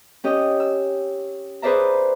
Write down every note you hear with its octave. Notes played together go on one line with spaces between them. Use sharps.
C#4 G4 D#5
E6
G#4 B4 C5 D5 E5 A#5